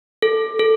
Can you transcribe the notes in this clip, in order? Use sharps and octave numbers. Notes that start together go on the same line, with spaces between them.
A4
A4